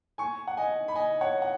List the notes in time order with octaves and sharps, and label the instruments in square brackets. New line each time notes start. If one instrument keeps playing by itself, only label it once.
[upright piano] G#5 C#6
F#5
D#5 G#5
B5
D#5 G#5
C#5 F#5
F#5